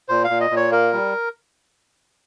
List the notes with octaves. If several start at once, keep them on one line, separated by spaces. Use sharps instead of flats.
A#2 C5
F5
A#2
D#5
A#2
C#5
A#3 A#4
G3